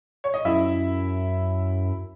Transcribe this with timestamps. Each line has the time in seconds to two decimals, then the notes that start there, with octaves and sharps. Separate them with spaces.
0.24 C#5
0.34 D#5
0.45 F#2 E4 E5